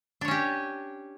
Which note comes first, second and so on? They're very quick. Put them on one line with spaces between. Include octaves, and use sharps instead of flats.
D4 C#5 C#4 G4